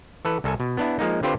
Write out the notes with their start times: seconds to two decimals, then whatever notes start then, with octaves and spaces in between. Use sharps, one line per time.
0.25 E3 A4 B4
0.44 C2 A4 G#5
0.60 B2
0.77 B3 D4 E4
0.99 F3 G#3 A#3 D#4
1.23 D3 C4 F4 G4 B4 C5